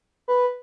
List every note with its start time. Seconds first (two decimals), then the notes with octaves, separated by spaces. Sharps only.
0.28 B4